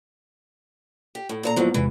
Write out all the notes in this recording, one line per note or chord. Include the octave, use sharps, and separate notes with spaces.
G4
A2
A#2 C5 A#5
G#2 F3 F#3 A#3 B3 E4
E2 C3 E3 G#3